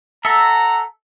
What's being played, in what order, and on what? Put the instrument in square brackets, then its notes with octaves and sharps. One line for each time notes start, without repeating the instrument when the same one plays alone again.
[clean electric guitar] A4 E5 [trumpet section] F#5 A#5